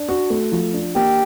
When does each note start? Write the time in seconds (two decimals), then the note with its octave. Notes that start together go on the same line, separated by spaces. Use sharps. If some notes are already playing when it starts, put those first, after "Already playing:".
Already playing: D4
0.09 F#4
0.30 A3
0.52 F3
0.73 D4
0.95 A#3 G4